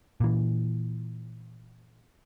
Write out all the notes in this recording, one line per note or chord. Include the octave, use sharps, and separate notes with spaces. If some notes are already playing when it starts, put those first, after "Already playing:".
A#2 E3